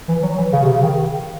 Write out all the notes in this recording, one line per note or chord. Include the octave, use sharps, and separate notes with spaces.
E3
F#3
E3
C#3
C3
C#3
D#3